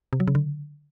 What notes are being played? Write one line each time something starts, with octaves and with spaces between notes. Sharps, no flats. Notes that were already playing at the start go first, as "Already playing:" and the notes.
C3
F#3
C#3
D3